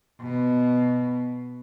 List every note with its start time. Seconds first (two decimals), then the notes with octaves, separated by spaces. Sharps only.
0.22 B2